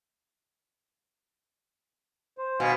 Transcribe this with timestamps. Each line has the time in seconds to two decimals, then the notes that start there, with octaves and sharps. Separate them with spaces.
2.38 C5
2.60 B2 F5 G#5